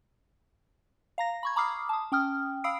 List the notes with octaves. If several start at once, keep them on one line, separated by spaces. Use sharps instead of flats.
F5 A#5 A#6
B5 C#6 G#6
A#5 B5 D6 D#6 F6 C7
A5 D#6
C#4 G5 D#6 F6
F5 B5 D#6 E6 C7 D7